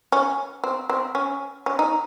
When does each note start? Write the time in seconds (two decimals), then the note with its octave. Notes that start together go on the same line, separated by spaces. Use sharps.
0.12 C#4
0.64 C4
0.90 C4
1.15 C#4
1.66 C#4
1.79 D#4